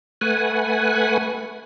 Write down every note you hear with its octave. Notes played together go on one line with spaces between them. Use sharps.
A3 B4 F#5 G#5